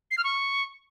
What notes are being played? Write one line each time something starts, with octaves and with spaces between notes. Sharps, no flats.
C7
F6
C#6